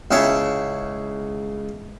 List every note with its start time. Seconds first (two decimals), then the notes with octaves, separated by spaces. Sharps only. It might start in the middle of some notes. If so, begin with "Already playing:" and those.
0.11 C#2 C#3 E4 C#5 G5 A5